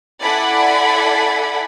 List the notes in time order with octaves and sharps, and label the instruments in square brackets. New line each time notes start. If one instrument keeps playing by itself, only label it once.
[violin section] E4 A4 D5 F#5 G#5 B5